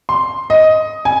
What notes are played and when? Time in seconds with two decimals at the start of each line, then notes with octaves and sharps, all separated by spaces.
0.09 C6
0.50 D#5
1.05 G#5